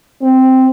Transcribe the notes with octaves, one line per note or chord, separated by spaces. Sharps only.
C4